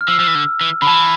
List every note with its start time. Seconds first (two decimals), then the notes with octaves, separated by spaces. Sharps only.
0.01 F6
0.08 F3 E6
0.19 F3
0.27 E3
0.35 D3
0.61 E3
0.82 D3 B5
0.87 E3 A5